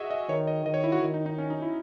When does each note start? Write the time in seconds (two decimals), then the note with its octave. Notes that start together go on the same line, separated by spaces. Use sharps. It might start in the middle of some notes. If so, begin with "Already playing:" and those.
Already playing: F#4 G#4 D#5 E5
0.10 D#5
0.29 D#3 C#5
0.47 D#5
0.66 D#3 D#5
0.74 C#5
0.84 E4
0.92 F#4
1.01 D#3
1.14 D#4
1.26 D#4
1.38 C#4
1.50 D#4
1.62 E4